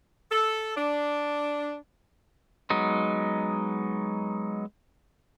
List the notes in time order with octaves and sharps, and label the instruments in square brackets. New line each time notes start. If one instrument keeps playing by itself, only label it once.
[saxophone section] A4
D4
[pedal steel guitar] F#3 G#3 B3 D#4